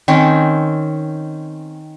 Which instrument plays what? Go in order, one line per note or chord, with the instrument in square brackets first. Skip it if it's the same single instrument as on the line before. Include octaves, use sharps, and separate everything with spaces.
[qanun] D#3 C4 C#4